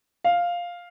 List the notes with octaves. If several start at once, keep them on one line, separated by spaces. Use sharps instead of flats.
F5